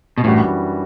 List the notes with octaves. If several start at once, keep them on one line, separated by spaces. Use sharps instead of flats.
B2
F#2 A2 E3 G3 D4 F#4